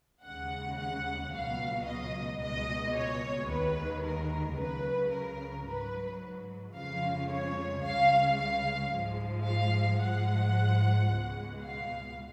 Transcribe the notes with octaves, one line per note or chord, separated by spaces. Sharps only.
D#2 C#3 G#3 F#5
F#5
C#2 B2 F#3 F5
D#5
C#2 B2 G#3 D#5
C#5
D#2 D#3 G#3 B4
A#4
C#2 C#3 F#3 B4
A#4
G#2 F#3 B4
F2 C#3 F3 G#3 F5
C#5
C#2 C#3 G#3 F5
F5
G#2 F3 G#3
F5
G#2 F3 G#3 F#5
C#2 B2 G#3
F5